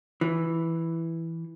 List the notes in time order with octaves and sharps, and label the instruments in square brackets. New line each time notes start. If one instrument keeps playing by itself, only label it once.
[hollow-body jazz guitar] E3